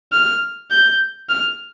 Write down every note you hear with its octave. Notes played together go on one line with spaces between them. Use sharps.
F6
G6
F6